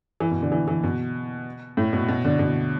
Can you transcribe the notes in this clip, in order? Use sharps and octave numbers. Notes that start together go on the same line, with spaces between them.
E3
B2
D3
E3
E3
B2
A2
B2
B2
D3
B2